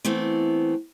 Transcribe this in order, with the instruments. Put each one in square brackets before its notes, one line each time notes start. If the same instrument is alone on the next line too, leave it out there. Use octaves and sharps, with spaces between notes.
[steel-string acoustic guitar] E3 A3 B3 C4